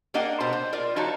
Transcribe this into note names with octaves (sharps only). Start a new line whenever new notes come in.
A#3 D4 A#4 D#5 F#5 G5
B2 C5 A5
C5
F4 A#4 D5
F3 D#4 F#4 C#5 A5 A#5